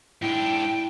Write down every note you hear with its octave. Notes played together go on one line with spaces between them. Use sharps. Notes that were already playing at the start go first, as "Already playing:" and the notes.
G#2 D4 E4 G5 E6